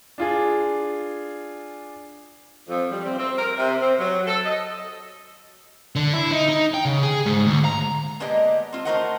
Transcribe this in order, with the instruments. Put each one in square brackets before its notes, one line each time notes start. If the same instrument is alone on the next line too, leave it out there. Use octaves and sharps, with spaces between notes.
[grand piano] D4 F4 G#4
[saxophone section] F2
G3
C4
C4
A#4
C3
C4
F#3
A4
D#5
[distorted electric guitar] D3
E4
D#4
D#4
G5
C#3
G#4
G#2
D2
A#5
[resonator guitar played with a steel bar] G#3 A#3 B3 G4 D5 D#5
C4 F4
A3 F4 A#4 C5 D#5 F#5